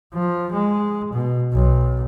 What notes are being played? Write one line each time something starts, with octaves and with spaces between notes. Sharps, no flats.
F3
G#3
B2
B1